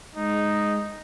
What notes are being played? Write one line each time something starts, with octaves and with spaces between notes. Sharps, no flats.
G#3 D#4